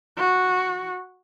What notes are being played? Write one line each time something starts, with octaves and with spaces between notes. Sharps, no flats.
F#4